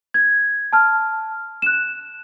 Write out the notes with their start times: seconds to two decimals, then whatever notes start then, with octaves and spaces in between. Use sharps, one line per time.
0.14 G#6
0.73 A5 F6
1.62 F#6 E7